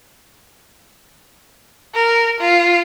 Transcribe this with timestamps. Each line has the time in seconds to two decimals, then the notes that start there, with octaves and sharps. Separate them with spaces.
1.95 A#4
2.40 F4